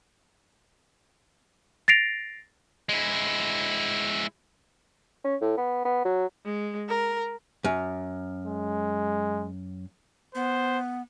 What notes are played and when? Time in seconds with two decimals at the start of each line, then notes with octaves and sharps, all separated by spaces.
1.88 A6 A#6 C7 D7 F7
2.89 G#3 E4
5.24 C#4
5.41 A2
5.57 B3
5.85 B3
6.05 F#3
6.45 G#3
6.89 A#4
7.64 F#2
8.45 G#3
10.35 B3 C5